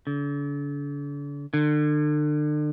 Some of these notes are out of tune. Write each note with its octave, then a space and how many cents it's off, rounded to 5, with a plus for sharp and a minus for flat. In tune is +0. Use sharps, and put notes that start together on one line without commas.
D3 -40
D3 +35